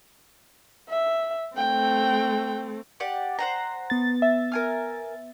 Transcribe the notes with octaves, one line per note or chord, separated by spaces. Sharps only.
E5
A3 C4 G5
G4 D5 F#5
C5 F#5 A#5
B3 A6
E5
A#4 G#5 F6